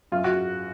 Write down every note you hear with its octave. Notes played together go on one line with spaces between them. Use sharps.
F#2 F4
F#4